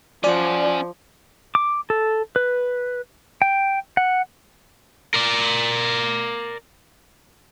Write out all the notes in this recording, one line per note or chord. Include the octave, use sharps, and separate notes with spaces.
F3 C#4 D5 F#5
D6
A4
B4
G5
F#5
A#4 D5